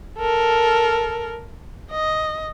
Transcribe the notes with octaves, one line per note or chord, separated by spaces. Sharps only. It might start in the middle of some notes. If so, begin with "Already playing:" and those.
A4 A#4
D#5